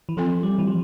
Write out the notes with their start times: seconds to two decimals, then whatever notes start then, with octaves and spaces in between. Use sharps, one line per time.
0.09 E3
0.17 F3 C4 F4 A4
0.43 G3
0.58 E3
0.67 F3